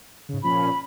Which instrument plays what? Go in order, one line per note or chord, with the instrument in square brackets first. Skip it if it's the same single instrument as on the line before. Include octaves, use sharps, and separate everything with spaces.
[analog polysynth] G#2 C#3
[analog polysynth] A#2 F3 C#4 [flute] B5